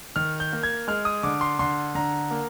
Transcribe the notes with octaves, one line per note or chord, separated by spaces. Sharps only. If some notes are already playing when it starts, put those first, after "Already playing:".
D#3 F6
G6
A#3
G#6
G#3 F6
D#6
D3 D6
C6
D3 C6
D3 A#5
A#3